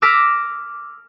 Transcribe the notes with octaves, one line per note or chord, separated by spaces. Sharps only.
D6 E6 F6 A#6 B6 D7